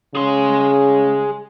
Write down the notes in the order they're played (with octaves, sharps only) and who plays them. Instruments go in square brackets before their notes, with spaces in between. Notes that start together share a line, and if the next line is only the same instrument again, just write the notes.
[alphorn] C#3 [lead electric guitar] G#4 C6